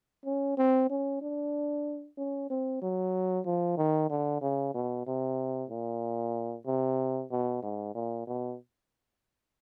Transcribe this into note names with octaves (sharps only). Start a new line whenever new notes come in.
C#4
C4
C#4
D4
C#4
C4
F#3
F3
D#3
D3
C#3
B2
C3
A#2
C3
B2
G#2
A#2
B2